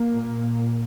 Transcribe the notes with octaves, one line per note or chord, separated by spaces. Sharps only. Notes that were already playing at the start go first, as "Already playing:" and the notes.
Already playing: A#3
A#2